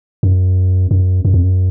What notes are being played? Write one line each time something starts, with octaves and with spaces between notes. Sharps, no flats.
F#2
F#2
F#2
F2
F#2